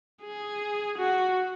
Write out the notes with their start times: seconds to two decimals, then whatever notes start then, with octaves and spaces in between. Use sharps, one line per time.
0.22 G#4
0.98 F#4